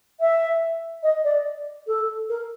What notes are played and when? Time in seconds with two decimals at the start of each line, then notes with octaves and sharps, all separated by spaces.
0.20 E5
1.03 D#5
1.24 D5
1.87 A4
2.29 A#4